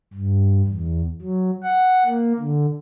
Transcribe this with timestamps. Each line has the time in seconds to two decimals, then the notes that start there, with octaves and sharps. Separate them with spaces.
0.14 G2
0.67 E2
1.21 F#3
1.64 F#5
2.05 A#3
2.39 D3